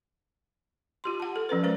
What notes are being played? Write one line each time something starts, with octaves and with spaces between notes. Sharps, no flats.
F4 G4 C6
F#5 A5
A4
F3 C#4 A4 B4
G#3 A#4 C5